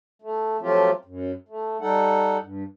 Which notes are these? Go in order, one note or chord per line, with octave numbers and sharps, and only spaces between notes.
A3
F3 F#3 A3 C4 F4 G4
F#2
A3
G3 D#4 A4 F#5
G2